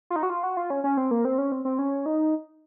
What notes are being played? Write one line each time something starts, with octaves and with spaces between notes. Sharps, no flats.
F4
D#4
F#4
F4
F#4
F4
C#4
C#4
C4
A#3
C4
C#4
C4
C4
C#4
D#4